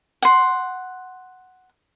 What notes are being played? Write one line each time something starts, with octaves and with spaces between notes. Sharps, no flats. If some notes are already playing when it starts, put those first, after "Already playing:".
F#5 C6